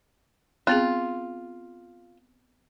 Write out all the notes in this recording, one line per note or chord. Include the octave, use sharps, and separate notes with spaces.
B3 C4 F4 G#4